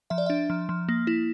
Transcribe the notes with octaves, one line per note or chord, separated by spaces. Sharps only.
F3 E5
D5
D4 E5
F3
F3
A#3
E4